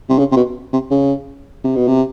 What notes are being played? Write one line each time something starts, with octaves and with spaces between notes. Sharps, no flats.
C3
C#3
C3
B2
C3
C#3
C3
B2
C3